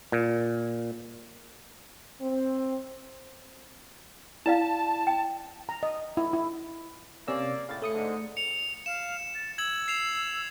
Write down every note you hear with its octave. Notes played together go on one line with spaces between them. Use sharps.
A#2
C4
E4 D5 F5 A5
G5
A#5
D#5
E4
E4
C3 A#3 C#4 D5 E6
A2 C#3 F5 A6
A3 D#6 C#7
G#2 D3
C#7 F7
F5 E7
A6
E6 G#6 F#7
C7 E7 F7